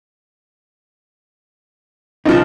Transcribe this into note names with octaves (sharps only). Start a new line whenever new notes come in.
B1 C#3 F3 D#4